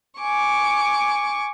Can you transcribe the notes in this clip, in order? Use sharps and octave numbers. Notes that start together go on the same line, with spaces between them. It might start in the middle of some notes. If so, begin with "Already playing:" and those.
G#5 C#6 D6